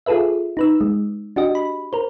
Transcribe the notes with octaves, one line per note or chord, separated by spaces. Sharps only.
F4 G#4 A4 B4 E5
D#4 B4 E6
G#3
D4 F#4 G4 D#5
B5
A#4 C5